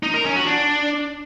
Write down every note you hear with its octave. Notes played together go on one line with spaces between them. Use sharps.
D#4
A#4
C#4
F#4
D4